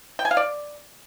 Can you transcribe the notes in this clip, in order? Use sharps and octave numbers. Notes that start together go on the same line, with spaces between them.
G5
G#5
F5
D5